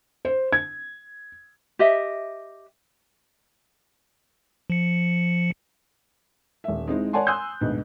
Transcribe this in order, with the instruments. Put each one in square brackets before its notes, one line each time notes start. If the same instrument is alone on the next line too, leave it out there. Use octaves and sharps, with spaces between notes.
[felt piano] C5
G#6
[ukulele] G4 D#5 E5
[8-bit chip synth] F3 C#7
[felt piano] D#1 E5
G#3 C4 D#4 E4
C#5 D5 F#5 G#5 A5 C6
G#5 C6 D#6 E6 F#6 G6
D2 G#2 B2